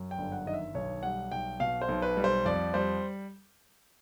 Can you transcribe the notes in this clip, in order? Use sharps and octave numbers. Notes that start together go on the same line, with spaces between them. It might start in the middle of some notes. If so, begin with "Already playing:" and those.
Already playing: F#2
G5
G1
F#5
D#3 D#5
E5
B1 C#5
G3 F#5
B1 G5
B2 F5
C5
B1
B4
G3
C5
F2 D5
G3 C5